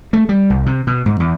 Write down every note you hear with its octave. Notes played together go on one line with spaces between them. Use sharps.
A3
G3
C2
C3
B2
G#2
E2